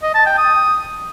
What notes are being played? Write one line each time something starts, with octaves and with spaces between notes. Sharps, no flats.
D#5
A5
G5
D#6